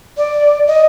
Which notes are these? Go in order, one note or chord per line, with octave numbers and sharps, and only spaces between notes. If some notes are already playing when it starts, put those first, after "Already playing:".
D5
D#5